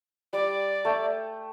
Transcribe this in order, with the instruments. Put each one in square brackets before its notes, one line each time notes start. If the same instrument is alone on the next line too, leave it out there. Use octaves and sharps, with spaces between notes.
[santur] G3 [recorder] D5
[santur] A3 G5